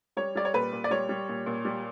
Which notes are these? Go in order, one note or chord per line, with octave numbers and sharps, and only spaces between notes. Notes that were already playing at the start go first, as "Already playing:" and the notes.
G3 C#5
G3 D5
C#5
A#2 B4
A#2
D5
G3 C#5
G3
A#2
A#2
G3